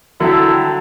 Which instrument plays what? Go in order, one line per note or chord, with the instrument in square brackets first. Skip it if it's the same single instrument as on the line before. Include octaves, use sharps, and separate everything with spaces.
[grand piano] D3 F#3 [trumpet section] E4 A4 E5 G5